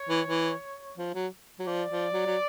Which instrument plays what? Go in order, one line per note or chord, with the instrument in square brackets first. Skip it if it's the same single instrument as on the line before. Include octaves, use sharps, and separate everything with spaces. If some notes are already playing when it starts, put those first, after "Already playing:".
Already playing: [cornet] C#5
[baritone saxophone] E3
E3
F3
F#3
F#3
[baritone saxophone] F3 [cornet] D5
[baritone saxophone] F3
F#3
F#3